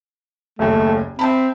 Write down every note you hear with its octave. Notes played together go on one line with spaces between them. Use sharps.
F#1 D#2 A3
C4 E5 A5 B5